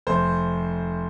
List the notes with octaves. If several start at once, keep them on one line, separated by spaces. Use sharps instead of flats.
F1 C5